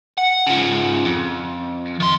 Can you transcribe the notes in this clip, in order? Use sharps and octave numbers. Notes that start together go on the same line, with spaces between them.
F#5
C#3 F3
F2
D#3 C6